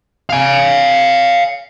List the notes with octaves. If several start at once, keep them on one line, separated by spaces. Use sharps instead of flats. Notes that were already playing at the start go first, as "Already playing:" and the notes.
F5 G#5